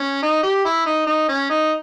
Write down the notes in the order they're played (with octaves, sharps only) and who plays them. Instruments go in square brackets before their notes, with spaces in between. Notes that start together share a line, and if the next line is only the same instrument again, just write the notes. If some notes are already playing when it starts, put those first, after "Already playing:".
Already playing: [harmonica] C#4
D#4
G4
E4
D#4
D#4
C#4
D#4